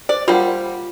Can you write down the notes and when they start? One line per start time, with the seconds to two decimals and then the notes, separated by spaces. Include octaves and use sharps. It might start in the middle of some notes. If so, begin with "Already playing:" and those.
0.09 C5 D5
0.28 G3 A#3 F4 C5 F#5